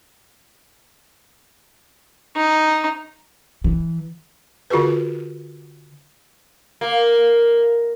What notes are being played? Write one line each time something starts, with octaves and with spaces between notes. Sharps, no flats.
D#4
E3
D3 F4 F#4 G#4 B4
A#3